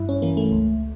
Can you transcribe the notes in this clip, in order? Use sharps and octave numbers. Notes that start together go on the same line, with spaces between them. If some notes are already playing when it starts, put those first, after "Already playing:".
Already playing: G2 E4
C#4
E3 A#3
A3
C#2